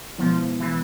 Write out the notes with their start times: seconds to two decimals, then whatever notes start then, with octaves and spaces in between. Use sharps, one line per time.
0.18 B2 F3 G#3 B3 E4
0.60 E3